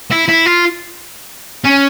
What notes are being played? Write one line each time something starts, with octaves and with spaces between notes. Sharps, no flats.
E4
E4
F4
C#4